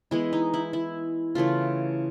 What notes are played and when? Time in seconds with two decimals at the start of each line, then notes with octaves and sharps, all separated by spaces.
0.11 E3 G#3 B3 E4
0.33 D#4
0.54 E4
0.73 E4
1.35 C#3 E3 A3 F4